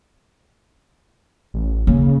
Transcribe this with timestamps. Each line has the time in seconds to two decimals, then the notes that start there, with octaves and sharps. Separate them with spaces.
1.54 A1
1.87 C#3 A#3